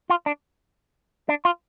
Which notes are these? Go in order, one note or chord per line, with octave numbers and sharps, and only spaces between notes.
F4
D4
D4
F4